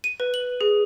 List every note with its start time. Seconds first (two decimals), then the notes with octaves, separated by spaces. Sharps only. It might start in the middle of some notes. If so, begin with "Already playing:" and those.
0.04 D#7
0.20 B4
0.34 F#7
0.61 G#4